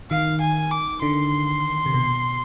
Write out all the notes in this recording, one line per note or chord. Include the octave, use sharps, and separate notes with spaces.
D#3 F5
G#5
D6
D3 C6
C3
B2